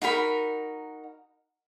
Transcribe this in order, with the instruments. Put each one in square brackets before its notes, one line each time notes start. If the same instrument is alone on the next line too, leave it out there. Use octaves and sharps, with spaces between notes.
[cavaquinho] D#4 F#4 A#4 B5